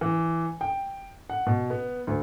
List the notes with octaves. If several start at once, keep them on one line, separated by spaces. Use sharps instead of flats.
E3
G5
F#5
B2
B3
D2